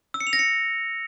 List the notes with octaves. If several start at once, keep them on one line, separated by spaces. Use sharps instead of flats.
E6
C#7
F7
A#6
C#7